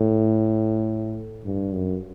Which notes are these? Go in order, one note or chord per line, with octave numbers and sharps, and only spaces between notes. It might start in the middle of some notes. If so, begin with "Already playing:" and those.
Already playing: A2
G2
F#2